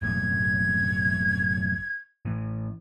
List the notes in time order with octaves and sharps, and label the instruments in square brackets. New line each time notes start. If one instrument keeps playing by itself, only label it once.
[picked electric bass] F#1 B1 A2 [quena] G#6
[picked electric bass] A2 E3